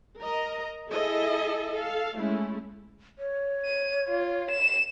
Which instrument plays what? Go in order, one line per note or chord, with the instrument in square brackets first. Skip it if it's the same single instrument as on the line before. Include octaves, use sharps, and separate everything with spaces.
[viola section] A#4 D#5 A#5
E4 G#4 A4 D#5 E5
A4 F5
G#3 A3 C#4 E4
[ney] C#5
[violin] D#7
F4
E7